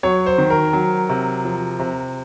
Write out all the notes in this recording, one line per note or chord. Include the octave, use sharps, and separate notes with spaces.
F#3 C#5
C5
D#3
A#4
F#3
C3
F3
C3